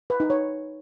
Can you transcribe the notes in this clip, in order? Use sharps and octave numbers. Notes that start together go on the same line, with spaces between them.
B4
D#4
C#5